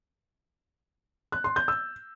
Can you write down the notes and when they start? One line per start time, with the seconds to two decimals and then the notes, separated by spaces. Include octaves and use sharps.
1.32 F#6
1.44 C6
1.56 G6
1.68 E6